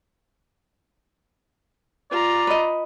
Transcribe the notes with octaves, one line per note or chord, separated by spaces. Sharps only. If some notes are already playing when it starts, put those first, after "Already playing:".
F4 D5 A#5
B4 D#5